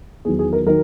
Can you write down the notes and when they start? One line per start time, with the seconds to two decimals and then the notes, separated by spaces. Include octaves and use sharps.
0.25 E2 D#3 F#3 G#4
0.39 G#4
0.53 A#4
0.66 D#3 F#3 A#4